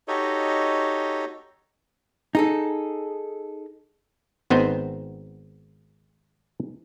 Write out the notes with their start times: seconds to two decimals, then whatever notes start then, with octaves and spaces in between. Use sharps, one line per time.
0.08 D#4 F#4 G4 A4 C#5 D#5
2.35 D#4 G#4 A4
4.50 G#1 B3 C4 D#4 C5